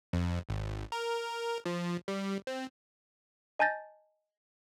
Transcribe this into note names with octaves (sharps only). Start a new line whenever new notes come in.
F2
G#1
A#4
F3
G3
C4
D#5 G#5 A5 G6 A6 A#6